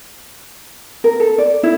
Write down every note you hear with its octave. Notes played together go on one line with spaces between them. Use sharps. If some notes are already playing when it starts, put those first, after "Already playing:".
A#4
A4
D5
E4